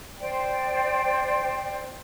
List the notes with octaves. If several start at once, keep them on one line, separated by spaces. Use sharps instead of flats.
C5 D5 G5